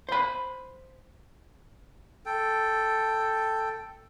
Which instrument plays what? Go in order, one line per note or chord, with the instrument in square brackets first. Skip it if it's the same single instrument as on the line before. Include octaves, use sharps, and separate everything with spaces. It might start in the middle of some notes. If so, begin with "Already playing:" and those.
[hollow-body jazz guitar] C5 B5
[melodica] A4 G5